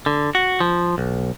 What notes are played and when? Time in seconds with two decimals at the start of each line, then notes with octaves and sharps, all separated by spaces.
0.06 D3
0.35 F#4
0.60 F3
0.98 B1